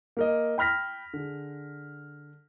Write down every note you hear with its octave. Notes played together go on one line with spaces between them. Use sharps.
A#3 A#4 D#5
G5 B5 F6 A#6 B6
D3 G#4